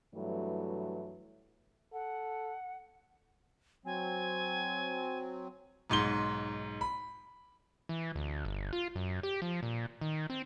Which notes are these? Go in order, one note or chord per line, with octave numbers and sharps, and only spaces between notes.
G2 E3 F#3 A3
A4 F#5
F#3 C4 G#5
B1 G#2 C6 G7
B5
E3
D2
G1
F4
F#2
G4
F3
A#2
D#3
C4